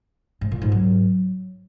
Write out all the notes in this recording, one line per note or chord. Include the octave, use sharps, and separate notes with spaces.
G#2
A#2
G#2
F#3